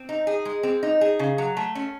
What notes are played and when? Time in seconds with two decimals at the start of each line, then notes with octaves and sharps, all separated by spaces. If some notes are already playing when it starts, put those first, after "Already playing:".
Already playing: C4
0.09 D#4
0.27 G#4
0.45 G#3
0.63 C4
0.83 D#4
1.01 G#4
1.19 C#3
1.38 F#3
1.57 A3
1.75 C#4